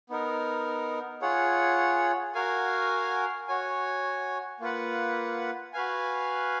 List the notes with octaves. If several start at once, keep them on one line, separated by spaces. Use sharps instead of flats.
B3 D#4 A#4
F4 G#4 C#5 F#5
F#4 A#4 F5 G#5
F#4 C#5 G#5
A#3 F4 B4 F#5
F#4 B4 F5 G#5